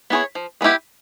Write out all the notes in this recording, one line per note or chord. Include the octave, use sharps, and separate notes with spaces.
B3 E4 G#4 C#5
F3
G#3 B3 E4 G4